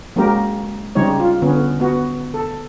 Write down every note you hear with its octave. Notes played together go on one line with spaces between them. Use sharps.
F#3 G#3 A#3 C#4 G4 A#4
C#3 G3 C4 D#4 C#5
F4
D3 B3 C#4
B3 F#4
A4